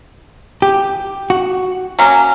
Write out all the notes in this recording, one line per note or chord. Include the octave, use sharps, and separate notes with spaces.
G4
F#4
F#3 A#3 C#4